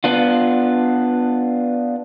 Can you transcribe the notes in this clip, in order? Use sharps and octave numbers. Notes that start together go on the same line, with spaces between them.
B3 D4 F4